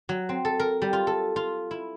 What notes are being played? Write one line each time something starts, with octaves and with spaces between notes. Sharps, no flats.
F#3
C4
A4
A#4
G3
F4
A4
F4
E4